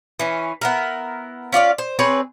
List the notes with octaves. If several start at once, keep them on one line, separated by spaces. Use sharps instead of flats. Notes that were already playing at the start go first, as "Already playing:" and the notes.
E3 C#4
B3 E4 A#4
C#4 F4 D5 F5
C5
C4 G#4 B4 C#5